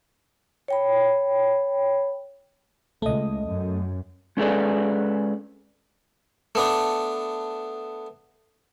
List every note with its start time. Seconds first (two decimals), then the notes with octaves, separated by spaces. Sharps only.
0.68 C#5 G5 B5
3.02 C#2 A3 D#5
3.48 F#2
4.37 G#3 C#4 G#4 A4 B4 D5
6.55 A3 B3 D4